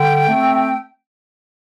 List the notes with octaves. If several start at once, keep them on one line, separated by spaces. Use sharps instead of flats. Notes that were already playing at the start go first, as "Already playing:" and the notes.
Already playing: D3 G5
A3 C4